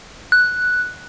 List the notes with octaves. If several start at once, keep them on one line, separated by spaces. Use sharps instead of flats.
F#6